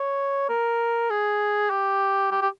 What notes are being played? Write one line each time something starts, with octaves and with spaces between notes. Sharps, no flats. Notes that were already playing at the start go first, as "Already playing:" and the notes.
Already playing: C#5
A#4
G#4
G4
G4
G4